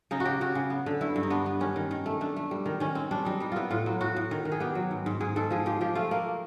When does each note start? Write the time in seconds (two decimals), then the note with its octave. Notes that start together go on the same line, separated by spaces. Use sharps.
0.11 C#3 D#4
0.20 F#4
0.25 C#3 G4
0.41 C#3 F#4
0.55 C#3
0.70 B3
0.86 D3
1.01 G2 E4
1.16 G2
1.23 D#4
1.30 B3 D4
1.46 B3
1.60 D#3 C#4
1.76 D#3
1.91 D#3
2.06 A3
2.21 A3 D4
2.36 A3
2.51 G3
2.66 D#3
2.80 D#3 C#4
2.95 C4
3.11 G3 D4
3.25 G3 D#4
3.40 G3 D#4
3.52 B3 E4 F4
3.71 A2 F4
3.86 F#3
4.01 A2 F#4
4.16 A2
4.31 D#3
4.45 D#3
4.52 G#4
4.60 B3 G4
4.75 F#3
4.91 G#2
5.06 G#2
5.20 G#2 G#4
5.36 G#2 A4
5.51 F3 G#4
5.66 F3 G4
5.81 F3 G4
5.95 A3 F4
6.11 A#3